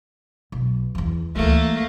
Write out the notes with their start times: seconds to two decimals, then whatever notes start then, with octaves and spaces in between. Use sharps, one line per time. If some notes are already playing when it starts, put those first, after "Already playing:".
0.52 B1
0.95 E2 E3
1.36 D2 E3 A3 A#3